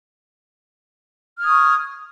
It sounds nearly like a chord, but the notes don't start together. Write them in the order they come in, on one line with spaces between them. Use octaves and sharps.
F6 G#6 D#6 C#6